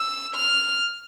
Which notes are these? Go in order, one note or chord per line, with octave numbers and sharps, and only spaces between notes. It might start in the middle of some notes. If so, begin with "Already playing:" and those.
Already playing: E6
F6